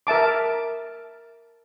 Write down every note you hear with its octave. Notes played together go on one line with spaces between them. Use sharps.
A#4 E5 A5 D6